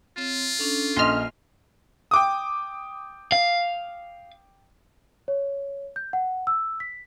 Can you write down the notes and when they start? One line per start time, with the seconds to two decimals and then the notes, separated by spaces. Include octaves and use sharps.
0.17 C4 F4 C#5
0.59 C#4 D4 A4
0.96 A#1 D#5 C6 F6
2.11 G5 D6 D#6
3.32 F5
5.28 C#5
5.96 G6
6.13 F#5
6.47 E6
6.80 B6